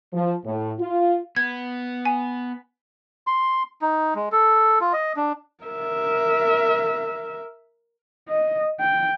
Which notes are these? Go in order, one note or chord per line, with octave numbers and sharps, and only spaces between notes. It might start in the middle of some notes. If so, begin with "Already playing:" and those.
F3
A2
F4
B3 G#6
G#5
C6
D#4
G#3
A4
F4
D#5
D4
A#4 E5
D#5
G5